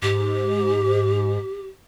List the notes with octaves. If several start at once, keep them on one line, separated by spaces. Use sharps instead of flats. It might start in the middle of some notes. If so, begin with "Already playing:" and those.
G#2 G4